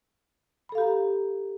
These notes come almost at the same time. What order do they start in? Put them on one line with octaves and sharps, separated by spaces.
B5 A4 F5 G4 A#5